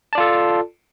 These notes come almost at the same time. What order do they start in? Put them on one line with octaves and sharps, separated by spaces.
A5 D5 F4 A4